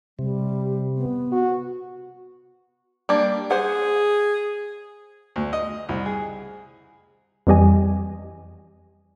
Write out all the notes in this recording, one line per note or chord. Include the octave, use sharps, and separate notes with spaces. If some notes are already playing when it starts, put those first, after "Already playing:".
C3 G3
B3
F#4
G3 A#3 D4
G#4 C5 F#5
D2
D#5
C2
G#4
F2 E3 G3 G4 D#5 G#5